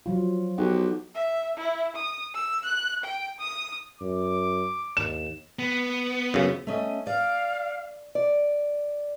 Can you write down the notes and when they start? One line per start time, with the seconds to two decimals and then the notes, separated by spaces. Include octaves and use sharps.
0.06 F3 F#3 F4
0.58 B1 G4 F#5
1.15 E5
1.57 E4
1.96 D#6
2.34 E6
2.65 F#6
3.03 G5
3.40 D#6
4.01 F#2 D6
4.97 D#2 E7
5.59 B3
6.34 F#2 C#3
6.67 A3 C#4 D#5
7.07 D5 F5
8.15 D5